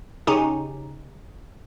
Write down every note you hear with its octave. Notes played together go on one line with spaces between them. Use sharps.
C#3 C#4 D#4 G4